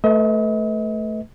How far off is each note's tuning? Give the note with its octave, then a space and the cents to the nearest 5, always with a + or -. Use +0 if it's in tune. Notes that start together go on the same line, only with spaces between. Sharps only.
A3 -5 B4 +0 D#5 +40